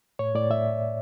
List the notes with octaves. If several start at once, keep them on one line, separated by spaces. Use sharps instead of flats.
A2 C#5
A2 D5
A2 E5